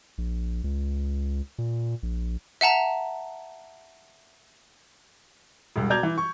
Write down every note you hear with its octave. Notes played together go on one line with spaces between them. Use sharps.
A#1
C#2
A#2
A#1
E5 F#5 A5 A#5
E1 C2
B2 D5 A#5 G6 G#6 F7
E3
C#6